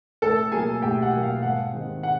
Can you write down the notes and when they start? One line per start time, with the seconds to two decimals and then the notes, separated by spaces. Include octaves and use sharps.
0.22 A2 A4 A5
0.52 F#3 A#3 G#4 G#5
0.82 A2 G4 G5
1.02 F#5
1.13 F#3 A#3
1.23 F5
1.42 G#2 F#5
1.72 D#3 G#3 C4
2.03 F#5